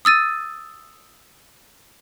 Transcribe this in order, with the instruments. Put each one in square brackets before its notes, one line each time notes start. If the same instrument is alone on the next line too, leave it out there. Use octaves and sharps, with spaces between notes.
[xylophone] D#6 E6 A6 D#7